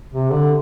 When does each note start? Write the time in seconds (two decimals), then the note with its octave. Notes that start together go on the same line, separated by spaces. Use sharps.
0.13 C3
0.31 D3